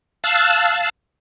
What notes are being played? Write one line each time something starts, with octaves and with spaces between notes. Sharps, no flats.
F5 A5 E6 F#6